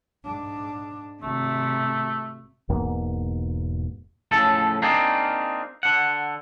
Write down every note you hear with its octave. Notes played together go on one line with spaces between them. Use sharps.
G#2 D4
G#1 C3 A3
E1 G#2 A#3 B3
A2 C#3 F3 A4
A#3 C4 D4 D#4 F4 G#4
D3 F#5